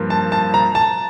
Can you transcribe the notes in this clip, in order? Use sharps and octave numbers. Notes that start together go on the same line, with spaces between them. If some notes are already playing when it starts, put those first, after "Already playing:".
Already playing: G2 F3 A#3
A5
A5
A#5
A5